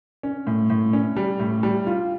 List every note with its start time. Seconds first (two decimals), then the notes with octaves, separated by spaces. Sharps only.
0.23 C#4
0.47 A2
0.70 A2
0.93 C#4
1.17 G3
1.40 A2
1.63 G3
1.87 F4